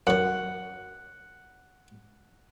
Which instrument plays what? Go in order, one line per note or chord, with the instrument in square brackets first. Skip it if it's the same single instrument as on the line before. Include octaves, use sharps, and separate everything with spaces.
[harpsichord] F#2 D#3 [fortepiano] F#5